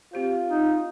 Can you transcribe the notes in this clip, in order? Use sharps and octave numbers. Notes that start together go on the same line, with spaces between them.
C4 F4 G4 C5
D#4